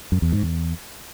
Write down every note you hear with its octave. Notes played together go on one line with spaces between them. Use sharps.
F#2
E2
G#2
E2